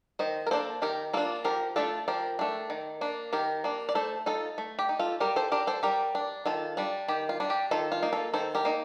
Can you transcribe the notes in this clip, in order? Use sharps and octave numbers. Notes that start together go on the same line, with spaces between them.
D#3 C5 D#5
A#4
A#3 D4 A4 C5
D#3 G4 A#4
A#3 D4 F4 A4
F3 G4 A#4
A3 D4 F4 A4
F3 G4 A#4
A3 D4
D#3
A#3 D4
D#3 G4 A#4
A#3 D4
D5
A3 A4 C5
D#4 F4 A4
A3
G4
D#4
F4 A4
G3 G4 A#4
A4 C5
D4 G4 A#4
A4 C5
G3 G4 A#4
D4
D#3 F4 A4
G3 D4
D#3 G4
F4
G3 D4
G4
D#3 F4 A4
F4
A#3 D#4
F4 A4
D#3 A4 C5
G4 A#4
A#3 D#4